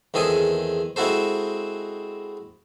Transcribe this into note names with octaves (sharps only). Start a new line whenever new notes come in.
E2 D#3 C4 G#4 A4 D#6
G#3 C4 E4 F#4 A4 C5